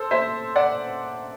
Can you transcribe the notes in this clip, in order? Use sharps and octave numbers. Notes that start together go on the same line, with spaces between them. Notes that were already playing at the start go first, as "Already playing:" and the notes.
Already playing: A4 C5
C5 E5
D5 F#5